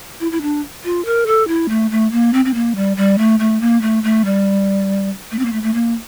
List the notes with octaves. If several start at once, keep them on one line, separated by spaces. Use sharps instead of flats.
E4
E4
D4
F4
A#4
A4
E4
A3
A3
A#3
C4
C4
A#3
G3
G3
A3
A3
A#3
A3
A3
G3
A3
C4
A#3
A3
A3
A#3